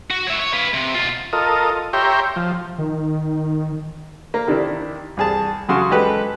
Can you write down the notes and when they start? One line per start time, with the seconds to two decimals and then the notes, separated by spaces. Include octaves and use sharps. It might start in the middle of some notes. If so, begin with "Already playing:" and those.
0.10 F#4
0.27 C#5 E5
0.39 C#5
0.53 B4 F5
0.74 C3
0.94 B2 F4
1.33 F4 A4 A#4 D#5
1.93 G4 C#5 E5 G5 A#5 C6
2.36 F3
2.78 D#3
4.34 A#3
4.47 C3 D#3 D4 E4
5.17 C2 G#4 A5
5.69 F#2 C#3 F#4 C6
5.91 G#3 G4 A4 B4